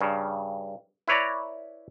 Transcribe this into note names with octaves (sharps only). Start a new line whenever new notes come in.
G2 C#3
E4 B4 C#5 D5 A#5